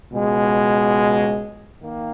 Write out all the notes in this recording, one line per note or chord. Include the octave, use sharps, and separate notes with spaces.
C#2 B2 G#3
D#3 A#3